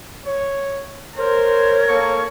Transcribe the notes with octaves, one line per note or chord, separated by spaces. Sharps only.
C#5
A#4 C5 C#5
A#3 A4 C#6